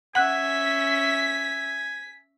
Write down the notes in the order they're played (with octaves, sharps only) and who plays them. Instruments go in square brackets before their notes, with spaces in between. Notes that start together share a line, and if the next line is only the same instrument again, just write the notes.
[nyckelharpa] C#4 E5 [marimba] F#5 F#6 [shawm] G#5 [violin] B6